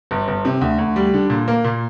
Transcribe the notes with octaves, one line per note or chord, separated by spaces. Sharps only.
G1
G1
C3
D2
D2
G3
D3
A#2
A#3
A#2